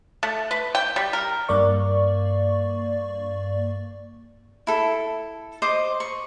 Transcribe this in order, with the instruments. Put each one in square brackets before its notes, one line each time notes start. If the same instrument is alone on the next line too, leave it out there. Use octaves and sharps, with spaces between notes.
[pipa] A3
B4
G5
G3
A#4
[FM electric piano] G2 A#3 D5 C#6
[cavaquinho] E4 A4
C5 D#5 D6
C#6